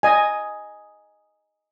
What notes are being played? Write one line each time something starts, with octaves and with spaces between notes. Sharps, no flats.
D#5 G#5